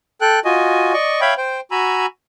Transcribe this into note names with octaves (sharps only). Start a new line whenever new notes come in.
A4 G5 F#6
F4 F#4 D#5 G#5
D5 D#5 C#6
C#5 E5 F5 G5 B5
C5 G5
F#4 G#5 A#5 B5 E6